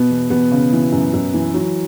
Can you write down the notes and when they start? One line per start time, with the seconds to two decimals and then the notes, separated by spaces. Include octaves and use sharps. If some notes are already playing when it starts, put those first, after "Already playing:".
Already playing: B2 B3
0.10 E2
0.30 E2 B2 B3
0.52 C#3
0.72 E3
0.92 F#2
1.13 F#2
1.34 E3
1.54 E3 F#3